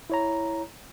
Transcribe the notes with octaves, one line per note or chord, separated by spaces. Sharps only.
E4 C#5 A#5